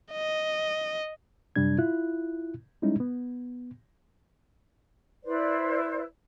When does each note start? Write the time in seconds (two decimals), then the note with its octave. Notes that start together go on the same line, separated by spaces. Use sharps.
0.12 D#5
1.56 F#2 C3 G3 D4 G#6
1.79 E4 F4 F#6
2.82 G3 G#3 C#4 D#4 E4
3.00 B3
5.24 E4 B4 C5 D5